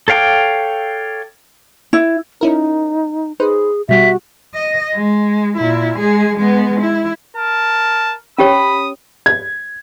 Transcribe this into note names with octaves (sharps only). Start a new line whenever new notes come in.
A4 C#5 F5 G5 D6
E4
C#4 D#4 E4 A#4
D#4 G#4 B4 C5
B2 G3 F#4 G4 E5
D#5
G#3
A#2 E4
G#3 G#4
G#3 B3
E4
A#4 A5
C#4 G4 C#5 B5 D#6
G#6